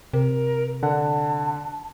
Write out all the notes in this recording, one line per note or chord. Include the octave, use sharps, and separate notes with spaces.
C3 A#4
D3 F#5 A5